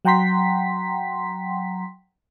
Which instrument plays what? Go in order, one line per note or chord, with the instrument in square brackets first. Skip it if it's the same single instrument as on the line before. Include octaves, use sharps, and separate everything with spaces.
[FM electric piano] F#3 F#5 G5 A#5 C6 B6